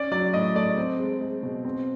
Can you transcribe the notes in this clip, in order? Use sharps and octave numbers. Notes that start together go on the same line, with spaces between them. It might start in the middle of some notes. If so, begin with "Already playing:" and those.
Already playing: C#4 D5
F#3 D5
A2 D#5
A3 D5
C4
G#3
G#3
B2
C4